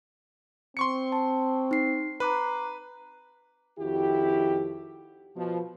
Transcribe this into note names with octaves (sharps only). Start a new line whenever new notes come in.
C4 C6 C#6 C#7
A5
D#4 C7
B4 A#5 D6 F#6
F2 D#3 E4 F#4 G4
B2 F3